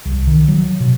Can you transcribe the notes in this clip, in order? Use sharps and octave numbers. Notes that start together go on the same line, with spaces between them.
C2
D#3
F#3
B2